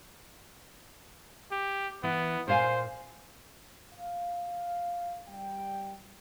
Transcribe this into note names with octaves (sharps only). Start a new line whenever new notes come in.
G4
E3 B3
A#2 C5 F5 G#5
F5
G3 G5